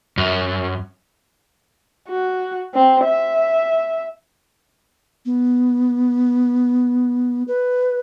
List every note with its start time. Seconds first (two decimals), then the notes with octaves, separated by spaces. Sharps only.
0.18 F#2
2.09 F#4
2.75 C4
3.04 E5
5.26 B3
7.48 B4